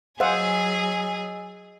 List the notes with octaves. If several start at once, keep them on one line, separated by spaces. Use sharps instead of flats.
F#3 G#4 C5 D#5 F5 F#5 G#5 E6